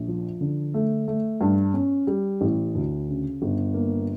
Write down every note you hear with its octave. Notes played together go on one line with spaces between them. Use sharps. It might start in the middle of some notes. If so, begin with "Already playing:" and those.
Already playing: A#1
F3
D3
A3
A3
G2
C#4
G3
A1
D2
C#3
G1
A#3